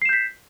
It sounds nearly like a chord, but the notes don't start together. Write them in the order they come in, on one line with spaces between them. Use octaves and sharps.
C7 E7 G6 B6